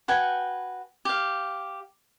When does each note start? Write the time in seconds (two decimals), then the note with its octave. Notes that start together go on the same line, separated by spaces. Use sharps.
0.08 F#4 B4 G5 G#5
1.05 G4 F5